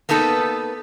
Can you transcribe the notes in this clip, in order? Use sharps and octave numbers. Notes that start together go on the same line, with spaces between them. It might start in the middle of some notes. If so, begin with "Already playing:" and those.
A#3 B3 D#4 A4 B4